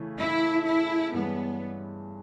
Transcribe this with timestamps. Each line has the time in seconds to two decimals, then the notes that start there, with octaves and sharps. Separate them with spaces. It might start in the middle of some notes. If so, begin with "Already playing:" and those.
Already playing: C#3 E3 A3
0.18 E4
0.66 E4
1.13 G2 E3 G#3 B3 C#4